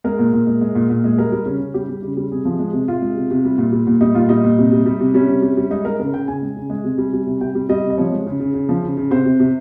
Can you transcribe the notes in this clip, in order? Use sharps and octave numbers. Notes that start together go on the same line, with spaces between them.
G#3 A#4
A#2
A#2
G#3
G#3
A#2
A#2
G#3
G3 A#4
G3
C#3 C#4
C#3
G3 G4
G3
C#3
G3
C3 G#4
F3
G#3
C3
C3 F4
G#3
C3
C3
G3
A#2
G3
A#2
G3 D#4
A#2 F4
G3 D#4
A#2
C3
G3
G3
C3
G3 C#4
C3
G3
G3
G#3 D#4
G#3 A#4
C#3 A#4
C#3 G5
C#3 G#5
G#3
C#3
G#3
C3
G3
G3
C3
C3 G5
G3
G3 D#5
C3
D#5
F3 C#5
G#3
C#3
C#3
C#3
F3
C#3
C#3
C3 C5
C3
C3